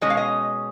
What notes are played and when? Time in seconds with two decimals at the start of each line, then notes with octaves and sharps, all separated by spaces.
0.01 B2 G#3 C#4 D#5
0.10 F5
0.17 D#5